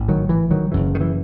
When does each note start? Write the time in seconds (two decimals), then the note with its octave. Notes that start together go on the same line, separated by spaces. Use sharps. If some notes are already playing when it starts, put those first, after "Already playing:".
Already playing: A1 G#2
0.08 D#3 F#3
0.29 E3
0.51 D#3 F#3
0.72 F#1 F#2 C#3 E3
0.95 D#3
1.01 E3